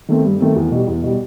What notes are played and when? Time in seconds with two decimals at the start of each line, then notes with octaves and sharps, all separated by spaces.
0.09 D#3 A3 C4
0.24 G2
0.40 D#3 A3 C4
0.56 E2
0.72 B2 G3
0.88 E2
1.04 B2 G3